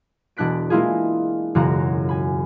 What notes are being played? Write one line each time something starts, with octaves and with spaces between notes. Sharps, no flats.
E1 B2 D4 F#6 B6 D7
G#3 A#3 E4 F4 G#4
E1 F#2 C#3 F#4 F#5 A#5
G#5 B5